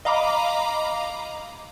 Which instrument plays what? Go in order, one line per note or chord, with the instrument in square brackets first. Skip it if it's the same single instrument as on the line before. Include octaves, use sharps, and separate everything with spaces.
[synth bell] D#5 F5 A#5 B5 D6